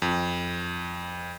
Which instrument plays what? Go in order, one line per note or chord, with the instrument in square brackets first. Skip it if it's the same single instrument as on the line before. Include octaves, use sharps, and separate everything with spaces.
[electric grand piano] F2